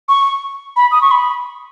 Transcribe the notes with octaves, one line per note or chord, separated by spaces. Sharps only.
C#6
B5
D#6
C#6
B5